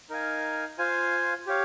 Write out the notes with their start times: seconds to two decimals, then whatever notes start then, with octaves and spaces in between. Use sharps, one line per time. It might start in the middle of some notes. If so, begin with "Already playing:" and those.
0.09 D#4 A#4 F5 G#5
0.78 F4 C5 F5 G#5
1.47 G4 C#5 F5